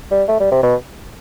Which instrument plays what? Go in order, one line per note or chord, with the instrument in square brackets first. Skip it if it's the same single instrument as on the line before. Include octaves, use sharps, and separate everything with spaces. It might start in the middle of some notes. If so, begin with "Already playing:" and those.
[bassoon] G3
A3
G3
C3
B2